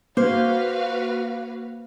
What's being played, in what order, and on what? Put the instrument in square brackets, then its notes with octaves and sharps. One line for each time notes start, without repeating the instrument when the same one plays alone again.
[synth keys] A#3 [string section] F#4 B4 F5 [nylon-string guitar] C5